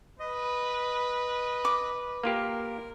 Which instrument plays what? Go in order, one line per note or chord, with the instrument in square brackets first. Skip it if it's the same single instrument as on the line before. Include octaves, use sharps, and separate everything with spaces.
[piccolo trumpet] B4 [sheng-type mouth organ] D#5
[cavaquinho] D6
[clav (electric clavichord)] A#3 F4 G4 [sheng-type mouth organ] A#4